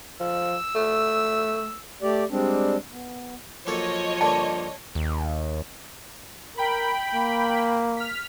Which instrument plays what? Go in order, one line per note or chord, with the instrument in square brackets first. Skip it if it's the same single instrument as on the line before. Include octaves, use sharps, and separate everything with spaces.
[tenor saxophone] F3 [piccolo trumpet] E6
[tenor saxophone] A3
[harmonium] A3 G4 D5
G3 G#3 C4 D4
B3
[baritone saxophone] F3 [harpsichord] F#3 A#3 A4 [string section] C#5 D#5
[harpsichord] G2 D3 A#3 [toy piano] A5
[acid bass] D#2
[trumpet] A#4 [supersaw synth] G5 B5
[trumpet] A#3
[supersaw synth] F6 B6